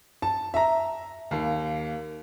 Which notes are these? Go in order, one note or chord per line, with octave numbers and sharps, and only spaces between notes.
A5
E5 A#5
D#2 A#3